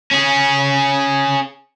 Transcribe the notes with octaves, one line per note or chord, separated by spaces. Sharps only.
C#4 G#4